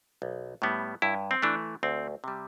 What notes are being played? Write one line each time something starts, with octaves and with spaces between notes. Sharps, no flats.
B1
A2 G3 B3
G2 E4
C4
E3 A3 D4
D2 C4
C3 G3